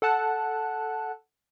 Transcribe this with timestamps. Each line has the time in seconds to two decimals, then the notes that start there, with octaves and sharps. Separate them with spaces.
0.02 A4 F#5 A5 F#6